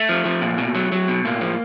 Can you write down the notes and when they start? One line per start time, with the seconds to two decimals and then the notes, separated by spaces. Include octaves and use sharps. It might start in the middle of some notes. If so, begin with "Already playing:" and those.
Already playing: A3
0.09 F3
0.25 F3
0.42 A#2
0.58 B2
0.75 F#3
0.92 F#3
1.08 B2
1.25 A2 A#3
1.41 F3